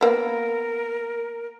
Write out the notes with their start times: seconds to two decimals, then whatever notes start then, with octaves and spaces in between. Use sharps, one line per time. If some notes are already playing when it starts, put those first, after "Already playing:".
0.01 A#3 B3 A#4